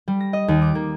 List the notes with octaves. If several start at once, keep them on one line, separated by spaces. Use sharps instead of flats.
G3
A#6
D#5
D#2
D6
A#3